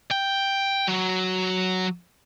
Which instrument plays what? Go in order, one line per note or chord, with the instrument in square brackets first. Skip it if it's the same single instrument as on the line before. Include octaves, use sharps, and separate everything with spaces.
[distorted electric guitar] G5
F#3